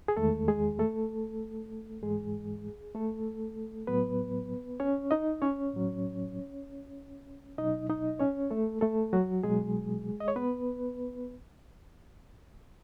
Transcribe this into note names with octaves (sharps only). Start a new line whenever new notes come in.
G#4
E2 D#3 G#3 A3 A4
G#3 G#4
A3 A4
G#2 E3 G#3 G#4
A3 A4
A2 F#3 B3 B4
C#4 C#5
D#4 D#5
C#4 C#5
A2 F#3
B2 F#3 D#4 D#5
D#4 D#5
C#4 C#5
A3 A4
A3 A4
F#3 F#4
B2 F#3 G#3 G#4
D#5
C#5
B3 B4